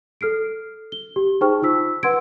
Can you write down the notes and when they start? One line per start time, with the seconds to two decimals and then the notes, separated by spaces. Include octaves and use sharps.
0.21 A4 F6 C7 D7
0.92 G7
1.16 G4
1.41 D#4 G#4 C5 G5 C#6 F6
1.62 D#4 F4 E6 B6
2.03 B4 F#5 C6 E6 G#6 D7